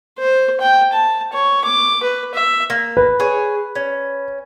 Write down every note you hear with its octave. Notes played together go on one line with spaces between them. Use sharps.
C5
G5
A5
C#5
D6
B4
E5
A#3
B4
G#4 C#5
C#4